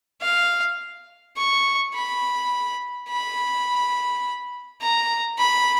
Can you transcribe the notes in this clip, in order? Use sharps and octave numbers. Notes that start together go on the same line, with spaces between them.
F5
C#6
B5
B5
A#5
B5